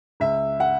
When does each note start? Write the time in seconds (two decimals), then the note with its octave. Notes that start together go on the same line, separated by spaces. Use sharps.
0.20 C#2 E5
0.60 F#5